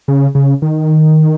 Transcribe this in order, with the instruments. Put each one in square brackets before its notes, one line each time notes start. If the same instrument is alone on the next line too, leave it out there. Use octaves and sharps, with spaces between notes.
[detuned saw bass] C#3
C#3
D#3